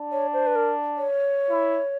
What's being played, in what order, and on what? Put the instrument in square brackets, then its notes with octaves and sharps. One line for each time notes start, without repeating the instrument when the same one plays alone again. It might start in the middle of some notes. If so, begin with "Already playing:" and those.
Already playing: [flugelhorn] D4
[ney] C#5
C5
B4
A#4
C#5
[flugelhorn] E4